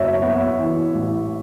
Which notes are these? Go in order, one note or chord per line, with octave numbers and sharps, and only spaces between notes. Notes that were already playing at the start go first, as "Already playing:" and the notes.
Already playing: F#1 F#2 C#5 E5
B3
E3
A1